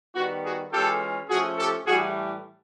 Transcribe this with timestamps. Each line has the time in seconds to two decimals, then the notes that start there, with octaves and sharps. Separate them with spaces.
0.15 D#3 G3 B3 F#4
0.45 F#4 G#4
0.73 E3 G#3 C#4 F4 G4 A4
1.30 F3 A3 C#4 F#4 G#4
1.59 G4 A4
1.87 A2 E3 G3 F#4 G#4